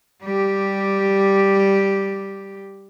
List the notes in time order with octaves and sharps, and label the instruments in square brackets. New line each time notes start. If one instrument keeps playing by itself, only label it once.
[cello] G3 G4